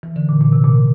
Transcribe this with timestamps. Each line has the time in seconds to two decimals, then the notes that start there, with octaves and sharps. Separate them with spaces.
0.03 E3
0.16 D3
0.29 A#2
0.41 A#2
0.53 C3
0.64 A#2